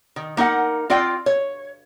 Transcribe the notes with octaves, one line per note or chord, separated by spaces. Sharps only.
D#3
A#3 D#4 A#4 F#5
C4 F4 D5 G5
C#5